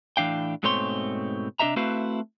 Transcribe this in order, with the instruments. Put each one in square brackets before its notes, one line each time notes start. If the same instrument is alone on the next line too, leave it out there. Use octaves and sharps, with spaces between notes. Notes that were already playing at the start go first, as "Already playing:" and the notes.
[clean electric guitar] A2 E3 D4 F5 G5
G#2 B2 A3 C4 C#5 C6
C3 D4 G#4 D#5 E5 A#5
A3 C4 E4 F#4 B4 F5